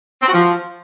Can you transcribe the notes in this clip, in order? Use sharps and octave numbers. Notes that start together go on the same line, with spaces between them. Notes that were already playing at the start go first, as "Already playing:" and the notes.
C4
F#4
F3